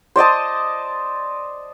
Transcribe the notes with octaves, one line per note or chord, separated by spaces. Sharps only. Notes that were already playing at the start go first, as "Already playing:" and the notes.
C5 D5 D#5 A5